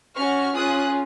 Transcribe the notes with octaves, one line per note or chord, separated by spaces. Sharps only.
C#4 F#4 C#6 F6
C#4 F4 G#4 D#6 F#6